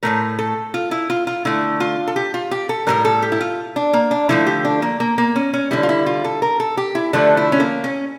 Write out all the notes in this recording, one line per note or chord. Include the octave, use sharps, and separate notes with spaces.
A2 F3 A3 A#4
A4
F4
E4
F4
F4
D3 A3 E4
F4
A4
G4
F4
G4
A4
A2 E3 G3 A#4
A4
G4
E4
F4
D4
A#3
D4
D3 F3 A3 E4
G4
D4
A#3
A#3
A#3
C#4
C#4
D3 G3 E4
F4
E4
F4
A4
A#4
A4
G4
E4
D3 F3 A3 D4
E4
C#4
A#3
C#4